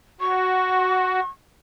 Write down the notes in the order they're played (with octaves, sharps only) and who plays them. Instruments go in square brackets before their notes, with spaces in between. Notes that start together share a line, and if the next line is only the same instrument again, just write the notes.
[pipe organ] F#4 [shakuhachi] C#6